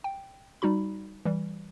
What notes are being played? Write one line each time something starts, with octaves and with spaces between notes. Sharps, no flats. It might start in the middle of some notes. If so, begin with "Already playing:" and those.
G5
G3 D#4 F#4 B5
E3 G3